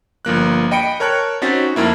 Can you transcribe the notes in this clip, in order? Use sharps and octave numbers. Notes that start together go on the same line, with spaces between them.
G1 F3 A#3 F#6
D#5 G5 B5 C#7 D7
A#4 C#5 A5 F#6
C4 C#4 D#4 F#4 A6 B6
F2 A#3 E4